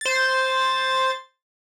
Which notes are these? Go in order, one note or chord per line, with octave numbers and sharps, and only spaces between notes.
C5 A6